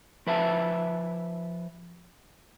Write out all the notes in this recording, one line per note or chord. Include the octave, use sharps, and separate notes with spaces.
F3 B4 E5 A5